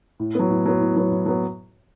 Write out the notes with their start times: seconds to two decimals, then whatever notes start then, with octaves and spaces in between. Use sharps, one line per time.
0.20 A2
0.35 F#3 B3
0.49 A2
0.66 F#3 B3
0.80 A2
0.96 F#3 B3
1.11 A2
1.26 F#3 B3